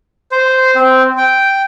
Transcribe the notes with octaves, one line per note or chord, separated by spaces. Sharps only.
C5
C4
G5